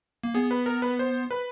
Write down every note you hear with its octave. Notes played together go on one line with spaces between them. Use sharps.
A#3
B3 G#4
B4
A#4
B4
C5
B4